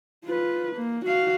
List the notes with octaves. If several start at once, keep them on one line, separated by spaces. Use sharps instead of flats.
F4 B4
A#3
F#4 F5